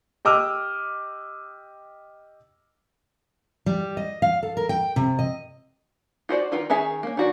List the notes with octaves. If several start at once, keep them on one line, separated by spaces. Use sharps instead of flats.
G4 D#5 D6 E6 F6
G3
D#5
F5
A4
A#4
G5
C3
D#5
F4 F#4 C5 D5
D#3 F4 B4
D#3 C#4 G#4 E5
A#3 C#4
D#3 F#4 D5